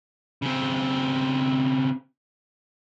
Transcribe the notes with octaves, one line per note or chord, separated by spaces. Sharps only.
C#3 C4